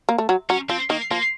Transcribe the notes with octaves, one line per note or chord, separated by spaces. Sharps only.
A#3
A3
F#3
F#3 C#4
F3 C4
D#3 A#3
F3 A#3